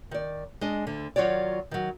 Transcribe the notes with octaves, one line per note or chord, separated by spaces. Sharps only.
D#3 D5
G#3 D4 D#5
D2 D3
D#3 F#3 F4 F#4 C#5 D5
D#3 F#3